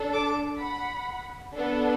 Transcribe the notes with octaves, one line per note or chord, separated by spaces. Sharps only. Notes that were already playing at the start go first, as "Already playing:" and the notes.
Already playing: D4 A4
A5 D6
F#5 B5
B3 D4 A4